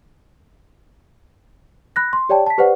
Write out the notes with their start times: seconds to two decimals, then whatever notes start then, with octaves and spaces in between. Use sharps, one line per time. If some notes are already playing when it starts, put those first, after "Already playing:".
1.96 B5 F#6 A#6
2.13 C6
2.29 G4 C#5 D5 G5 A5
2.46 A5 B6
2.58 G4 B4 C5 D5 F#5